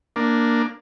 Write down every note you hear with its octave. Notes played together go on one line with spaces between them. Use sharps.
A#3 D4